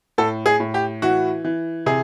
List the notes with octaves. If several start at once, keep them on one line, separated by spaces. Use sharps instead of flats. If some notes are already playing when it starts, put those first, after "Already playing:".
A2 A4
G#4
A2
G4
E3 F#4
E3
C3 G#4